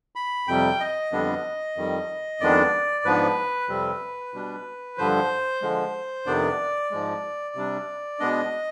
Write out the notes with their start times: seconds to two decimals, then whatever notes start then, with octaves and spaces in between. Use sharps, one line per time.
0.16 B5
0.48 F2 C3 G3 G5
0.80 D#5
1.12 F2 D3 G3 B3 D4
1.76 F2 D#3 G3
2.40 F2 D#3 G#3 B3 D4 D5
3.05 G#2 F3 B3 D4 B4
3.69 F2 C3 G3 C4
4.34 B2 G3 D4
4.98 G2 D3 F3 C5
5.62 D3 F3 G#3
6.26 F2 C3 D#3 B3 D4 D5
6.91 G#2 F3 G#3
7.55 C3 G3 D4
8.19 B2 G#3 B3 D4 D#5